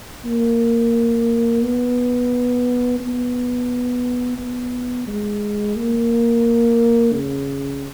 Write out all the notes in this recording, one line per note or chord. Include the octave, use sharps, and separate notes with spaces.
A#3
B3
B3
B3
G#3
A#3
C#3